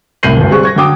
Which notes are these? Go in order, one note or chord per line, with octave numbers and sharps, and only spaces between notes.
C2 A2 G6 C7 D#7 F#7
G1 D2
G3 C4 G#4 C#6 F#6
C#6 G#6 A#6
D3 F#3 G5 D6 D#6